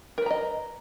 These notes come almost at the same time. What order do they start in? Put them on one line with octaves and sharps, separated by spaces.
A#4 B4 A#5 D#5